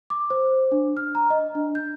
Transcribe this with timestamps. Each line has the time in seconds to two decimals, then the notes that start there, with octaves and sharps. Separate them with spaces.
0.10 D6
0.30 C5
0.72 D4
0.97 F6
1.15 A#5
1.30 D#5
1.55 D4
1.75 G6